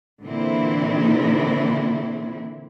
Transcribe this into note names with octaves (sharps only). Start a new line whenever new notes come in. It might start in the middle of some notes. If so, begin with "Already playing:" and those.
A#2 D3 E3 A#3 C4 E4